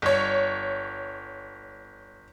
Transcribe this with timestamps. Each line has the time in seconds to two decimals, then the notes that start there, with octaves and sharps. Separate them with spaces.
0.02 G1 C#5